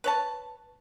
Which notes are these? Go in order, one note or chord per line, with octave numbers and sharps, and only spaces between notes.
B4 C#5 A5